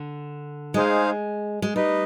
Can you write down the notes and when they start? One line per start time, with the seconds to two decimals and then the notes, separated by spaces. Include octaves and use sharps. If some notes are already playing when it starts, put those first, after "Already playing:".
Already playing: D3
0.74 G#3 D#4 G#4 C5 F5
1.62 G#3
1.76 G3 D#4 B4 D#5